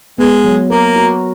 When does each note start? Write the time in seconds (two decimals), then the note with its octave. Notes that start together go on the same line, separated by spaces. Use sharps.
0.18 G#3 B3
0.44 F#3
0.70 A#3 A#4
0.96 F#4